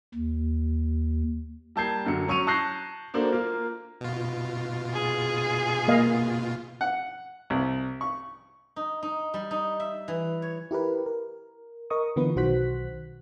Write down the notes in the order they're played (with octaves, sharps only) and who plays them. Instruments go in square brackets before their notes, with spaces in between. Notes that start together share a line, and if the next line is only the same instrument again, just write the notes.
[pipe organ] D#2
[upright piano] G3 A#3 A5 G6 G#6 C7
F#2 D3 F#3 C#7
F#3 C#4 C#6 C#7 D#7 F7
A5 C#6 F#6 G6 A#6 C7
A#3 D4 F#4 A4 C5
A#3 F4
[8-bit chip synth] B2 F4
[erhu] G#4
[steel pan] A#3 D#5 F5
[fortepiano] F#5
C2
C#6
[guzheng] D#4
D#4
G3
D#4
E5
E3
C#5
[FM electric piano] E4 G4 A#4 B4
A#4
A#4 D#5 C#6 D#6
D3 E3 B3 F4 B4
B1 D#3 F#4 C5 F#6 B6